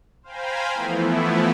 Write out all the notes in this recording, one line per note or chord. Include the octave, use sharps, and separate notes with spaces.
C5 F5 G5 G#5 A#5 B5
E3 F3 A3 B3 E4